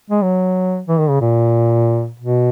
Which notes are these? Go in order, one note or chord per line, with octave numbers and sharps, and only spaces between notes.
G#3
F#3
E3
D#3
C#3
A#2
B2